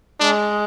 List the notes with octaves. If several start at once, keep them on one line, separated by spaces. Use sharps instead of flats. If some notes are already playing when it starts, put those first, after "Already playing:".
G#3 D4